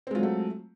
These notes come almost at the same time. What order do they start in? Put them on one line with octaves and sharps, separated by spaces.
C4 G#3 F4 F#3 A3